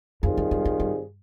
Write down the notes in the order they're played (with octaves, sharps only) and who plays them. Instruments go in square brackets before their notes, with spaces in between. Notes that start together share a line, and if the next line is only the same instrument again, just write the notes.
[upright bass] F2 [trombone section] D#3 G3 C4 F4 G#4
[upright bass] F2
G2
F2
G2